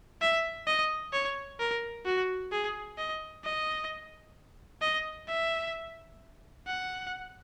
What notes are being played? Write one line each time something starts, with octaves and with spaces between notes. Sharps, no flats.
E5
D#5
C#5
A#4
F#4
G#4
D#5
D#5
D#5
E5
F#5